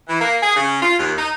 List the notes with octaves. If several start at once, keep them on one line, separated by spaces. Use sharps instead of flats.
E3
A#3
G#4
C#3
F4
D#2
D#4